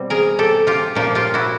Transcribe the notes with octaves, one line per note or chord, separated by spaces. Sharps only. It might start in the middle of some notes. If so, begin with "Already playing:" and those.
Already playing: B2 G3 C4
G#4 A#4
G4 A4
F4 G4
A#2 F3 A#3 F4 G4
F4 G4
E4 F#4